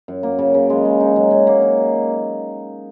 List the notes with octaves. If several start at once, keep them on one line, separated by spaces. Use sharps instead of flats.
F#2
A#3
C#3
C#3
G#3
G#3
D#4
F#3
F#3
A#3
D#4